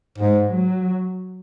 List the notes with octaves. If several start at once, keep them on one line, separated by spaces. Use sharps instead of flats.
G#2 G#3
F#3